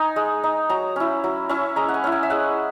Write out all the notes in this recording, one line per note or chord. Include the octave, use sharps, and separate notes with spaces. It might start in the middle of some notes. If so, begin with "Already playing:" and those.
Already playing: D#4 G#5 A#5
G#3
D#4
F#3 A#5
C#4 E4
F#3
C#4 E4
G#3 A#5
F#5
G#5
C#4 E4
G#5
E5
G#3 F#5